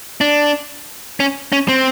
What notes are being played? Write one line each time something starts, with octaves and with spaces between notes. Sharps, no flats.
D4
C#4
C#4
C4